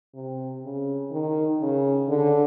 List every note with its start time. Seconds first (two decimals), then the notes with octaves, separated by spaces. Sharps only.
0.14 C3
0.63 C#3
1.11 D#3
1.61 C#3
2.09 D3